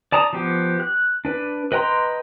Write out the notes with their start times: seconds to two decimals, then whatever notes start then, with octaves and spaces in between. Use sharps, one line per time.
0.12 D5 A5 A#5 D#6
0.33 F3 B3 G4
0.80 F#6
1.25 D4 B4
1.72 B4 D#5 G5 A#5 C6